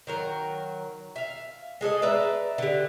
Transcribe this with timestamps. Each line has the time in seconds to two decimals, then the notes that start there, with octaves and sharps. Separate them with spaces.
0.07 D#3 F#3 A#4
1.16 E5 F5
1.81 G#3 G#4 A4 D#5
2.02 B4 D5 E5 A#5
2.58 D3 G4